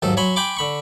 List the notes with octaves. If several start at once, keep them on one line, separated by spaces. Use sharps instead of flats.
D#2 G#2 F#3 A4
F#3 C#5 G#5 B5 C6
G5 G#5 B5 C6 D6
D3 B5 C#6